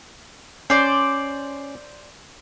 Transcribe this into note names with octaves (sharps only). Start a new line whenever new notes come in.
C#4 C5 D5